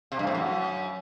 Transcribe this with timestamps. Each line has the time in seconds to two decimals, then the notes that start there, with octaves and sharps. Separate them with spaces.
0.12 C3
0.19 G2
0.27 A2
0.35 F#2